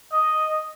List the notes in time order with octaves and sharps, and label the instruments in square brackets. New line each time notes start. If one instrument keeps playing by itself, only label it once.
[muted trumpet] D#5